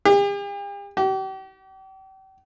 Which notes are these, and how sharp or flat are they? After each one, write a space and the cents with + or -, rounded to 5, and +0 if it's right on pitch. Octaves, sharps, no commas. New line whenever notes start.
G4 +45
G4 -40